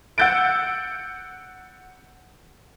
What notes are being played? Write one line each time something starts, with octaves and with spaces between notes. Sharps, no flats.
F#5 E6 G6 A6 D7